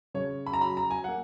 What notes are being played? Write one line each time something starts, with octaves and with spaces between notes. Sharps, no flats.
C#3 C#5
B5
A#5
F#3 B5
A#5
G#5
A#3 F#5